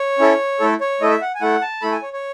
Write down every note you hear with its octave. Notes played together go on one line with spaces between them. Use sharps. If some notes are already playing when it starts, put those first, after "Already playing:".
Already playing: C#5
C#4 E4 A4
A3 E4 A4
C#5
A3 E4 A4 D#5
E5
F#5
G#5
A3 E4 A4 F#5
A5
A3 E4 A4 B5
G#5
C#5
C#5